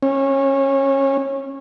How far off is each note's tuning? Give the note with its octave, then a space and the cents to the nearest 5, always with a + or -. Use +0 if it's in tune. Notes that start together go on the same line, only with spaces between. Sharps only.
C#4 -25